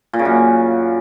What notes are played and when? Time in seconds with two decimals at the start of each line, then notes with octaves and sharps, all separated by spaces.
0.13 A#2
0.19 C#3
0.25 F#2